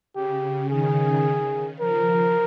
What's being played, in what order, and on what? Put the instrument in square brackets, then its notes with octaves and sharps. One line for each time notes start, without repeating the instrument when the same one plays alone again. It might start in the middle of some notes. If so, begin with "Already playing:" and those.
[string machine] C#3 [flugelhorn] G4
[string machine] D#3 [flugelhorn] G#4
[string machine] F3 [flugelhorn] A#4